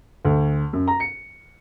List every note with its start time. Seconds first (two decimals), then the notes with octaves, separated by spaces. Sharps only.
0.25 D2
0.73 F#2
0.88 A#5
1.00 C#7